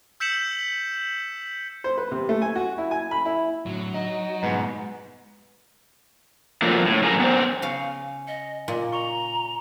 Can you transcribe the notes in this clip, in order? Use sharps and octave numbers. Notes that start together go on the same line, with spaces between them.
E6 G6 B6 C#7 E7 F#7
C5
B4
C3
A3
G#5
F#4
E4
G#5
B5
E4
A2 D3 F#3
D#4 D#5
G#2 B2 B3
D3 F3 F#3 A3 A#3
A2
F#2 A2 G#4 A#4 G#5 A#5
B3 D4 C5
C#3 F5 G#5 C#7
D#5 C#7
A#2 D#5
A#5 C#6 C#7 G7